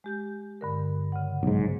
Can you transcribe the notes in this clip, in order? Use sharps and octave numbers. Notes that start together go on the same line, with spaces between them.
G#3 G4 G6
G2 D3 A#4
C#3 F#5
B1 G#2